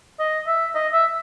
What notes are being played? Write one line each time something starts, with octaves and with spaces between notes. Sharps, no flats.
D#5
E5
D#5
E5